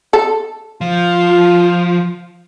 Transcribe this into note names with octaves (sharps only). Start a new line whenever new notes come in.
A4
F3 F4